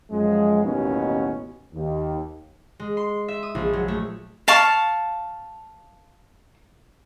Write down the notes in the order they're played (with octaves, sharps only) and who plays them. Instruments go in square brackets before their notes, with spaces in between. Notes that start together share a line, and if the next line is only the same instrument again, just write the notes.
[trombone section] F#2 F3 G#3
A1 D#2 B2 D#3 B3 C#4
D#2
[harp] G#3
C6
E5
D#6
A#1
F#3
A3
[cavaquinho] F5 A5 C#6